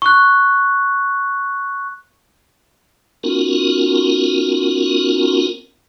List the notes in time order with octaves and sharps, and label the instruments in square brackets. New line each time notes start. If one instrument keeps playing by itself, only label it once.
[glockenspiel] C#6 F#6
[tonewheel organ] B3 C#4 D#4 F4 F#4 A#4